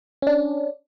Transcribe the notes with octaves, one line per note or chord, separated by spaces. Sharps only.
C#4 D4